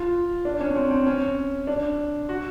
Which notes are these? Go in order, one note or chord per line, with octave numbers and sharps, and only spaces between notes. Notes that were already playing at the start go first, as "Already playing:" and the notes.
Already playing: F4
D4
C#4
C#4
C4
C4
C#4
D4
F#4